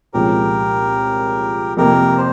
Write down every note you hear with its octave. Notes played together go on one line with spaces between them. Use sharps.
C2 A#2 F3 G#3 C#4 G4 A#4
F2 C3 F3 A#3 G4 A#4
C5